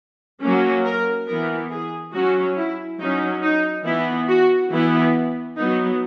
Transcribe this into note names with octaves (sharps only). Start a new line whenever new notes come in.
F#3 A#3 C#4
A#4
E3 B3 A#4
G#4
F#3 C#4 F#4
E4
F#3 C#4 D#4
D#4
E3 B3 E4
F#4
E3 B3 E4
F#3 B3 D#4